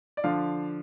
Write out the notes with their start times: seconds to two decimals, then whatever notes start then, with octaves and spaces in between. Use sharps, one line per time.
0.17 D5
0.24 D3 F3 D4 F5